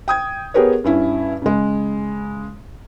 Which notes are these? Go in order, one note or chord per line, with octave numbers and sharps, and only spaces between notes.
G5 D#6 G#6
B3 G4 G#4 A#4 B4 C#5
G2 C#4 E4
C#3 G#3